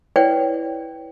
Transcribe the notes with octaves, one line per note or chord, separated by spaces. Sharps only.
E4 B4 C#5 D5 F#5 G5